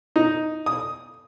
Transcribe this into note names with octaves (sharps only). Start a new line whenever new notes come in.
D#4
D#6